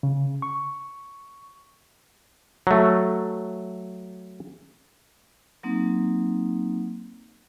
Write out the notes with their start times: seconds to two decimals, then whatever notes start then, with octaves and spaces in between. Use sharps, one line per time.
0.03 C#3
0.42 C#6
2.67 F#3 A3
5.63 F#3 A#3 C4 D#4